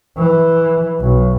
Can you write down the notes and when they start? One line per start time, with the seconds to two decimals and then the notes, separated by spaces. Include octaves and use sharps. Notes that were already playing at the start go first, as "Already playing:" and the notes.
0.17 E3
1.00 B1